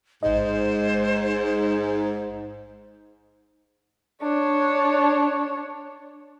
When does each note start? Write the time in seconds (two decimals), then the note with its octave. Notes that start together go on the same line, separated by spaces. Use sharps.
0.23 A1 G#2 C5 D#5
4.22 D4 C#5